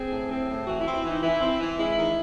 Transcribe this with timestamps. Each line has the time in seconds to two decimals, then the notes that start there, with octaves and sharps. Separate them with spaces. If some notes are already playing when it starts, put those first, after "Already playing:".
Already playing: C4 G#4
0.12 A2
0.30 C4
0.48 A2
0.67 E3 F#4
0.81 E4
0.86 C4
0.95 E4
1.04 E3 D#4
1.22 E3 E4
1.41 C4
1.60 E3
1.78 G#3 E4
1.97 D#3